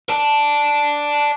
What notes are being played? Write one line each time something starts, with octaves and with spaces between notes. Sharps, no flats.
D5 A5